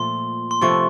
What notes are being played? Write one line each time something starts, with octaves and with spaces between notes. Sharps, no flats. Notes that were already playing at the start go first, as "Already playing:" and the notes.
Already playing: A#2 F3 A3 C6
C6
C3 F3 A3 C#6